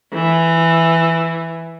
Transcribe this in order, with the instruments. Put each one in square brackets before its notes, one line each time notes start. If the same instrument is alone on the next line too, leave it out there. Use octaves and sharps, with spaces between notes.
[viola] E3